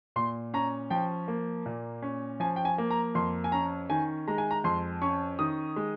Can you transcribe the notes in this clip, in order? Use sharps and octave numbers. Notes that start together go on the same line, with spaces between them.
A#2 C6
C#4 A#5
F3 G5
A#3
A#2
C#4
F3 G#5
G5
G#5
A#3
A#5
F2 C6
G#5
C#4 A#5
D#3 G#5
G#3 A#5
G#5
A#5
F2 C6
C#4 C#6
D#3 D#6
G#3